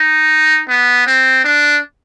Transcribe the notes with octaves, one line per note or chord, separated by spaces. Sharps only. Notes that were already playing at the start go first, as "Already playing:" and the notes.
Already playing: D#4
B3
C4
D4